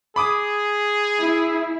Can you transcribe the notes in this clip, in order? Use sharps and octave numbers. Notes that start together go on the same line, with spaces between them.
G#4 B5 D6 D#6
E4